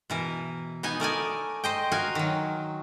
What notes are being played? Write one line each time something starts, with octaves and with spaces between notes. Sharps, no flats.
B2 E3 A#4
B3 D#4 G#5
A3 A#4 D5 G#5
C5 D#5 G5
F#4 A#4 F5 G#5
D#3 F#3